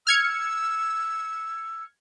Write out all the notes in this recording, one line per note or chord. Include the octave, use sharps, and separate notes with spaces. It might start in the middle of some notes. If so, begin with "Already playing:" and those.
E6 F6 G#6 C#7